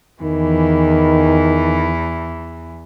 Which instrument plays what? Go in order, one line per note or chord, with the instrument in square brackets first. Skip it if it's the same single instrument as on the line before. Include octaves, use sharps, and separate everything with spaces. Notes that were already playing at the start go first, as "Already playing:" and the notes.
[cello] E2 E3 [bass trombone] D#3